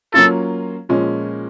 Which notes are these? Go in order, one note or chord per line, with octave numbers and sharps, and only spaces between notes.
F#3 A#3 C#4 F4 A4
A#2 F3 G#3 C#4